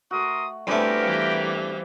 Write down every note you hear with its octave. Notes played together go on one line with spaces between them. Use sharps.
A3 F#4 A#4 C6 D#6
G2 E3 A3 B3 C4 G4 A#4
E3 G3 F5